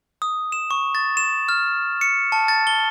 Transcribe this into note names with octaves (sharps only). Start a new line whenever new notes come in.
D#6
E7
C#6
A6
E7
F6
C#7
A5
A6
G7